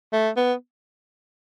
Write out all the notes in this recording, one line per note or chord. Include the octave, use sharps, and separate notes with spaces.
A3
B3